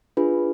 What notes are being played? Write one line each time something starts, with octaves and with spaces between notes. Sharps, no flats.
D4 F4 G#4 B4